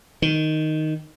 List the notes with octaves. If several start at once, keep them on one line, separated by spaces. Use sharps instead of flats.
D#3